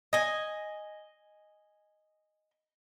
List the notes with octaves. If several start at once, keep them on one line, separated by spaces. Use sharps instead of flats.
D#5 G#5